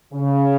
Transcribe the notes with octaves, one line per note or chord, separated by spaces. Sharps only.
C#3